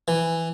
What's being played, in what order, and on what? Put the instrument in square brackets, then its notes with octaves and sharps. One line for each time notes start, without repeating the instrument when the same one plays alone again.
[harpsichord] E3